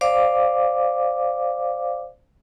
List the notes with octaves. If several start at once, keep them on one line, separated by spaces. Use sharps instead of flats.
C5 D5 F5 D6